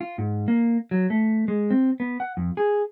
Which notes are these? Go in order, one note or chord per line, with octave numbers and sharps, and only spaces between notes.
F4
G#2
A#3
F#3
A3
G#3
C4
B3
F#5
F2
G#4